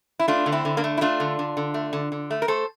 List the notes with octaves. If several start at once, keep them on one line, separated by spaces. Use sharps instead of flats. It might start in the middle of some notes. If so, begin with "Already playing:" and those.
E4
A3 D4 F4
D3
C4 E4
D3
A#3 D4
A3
E4
A3 D4 F4
D3
D3
D3
A3
D3
D3
A3
A#4
A3 A4 C5